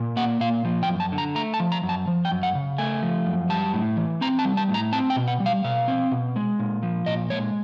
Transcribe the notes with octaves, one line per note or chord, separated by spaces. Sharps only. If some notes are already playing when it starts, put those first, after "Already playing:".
Already playing: A#2
A#3 F#5
A#2 F5
F3
G5
F#2
A5
D3
A#5
A3 A#5
A5
F3
A#5
F#2
A5
F3
G5
F#2
F#5
C#3
A3 G#5
F3
F#2
G3 A5
A2
E3
C4 A#5
A5
G3
A5
A2
A#5
C4 A5
G5
B2
F#5
G3
F5
B2 F5
C4
B2
G#3
A#2
F3
A#2 D#5
G#3 C#5